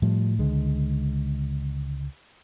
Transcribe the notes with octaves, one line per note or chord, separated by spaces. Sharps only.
A2 F3 G3
C#2 D3 G#3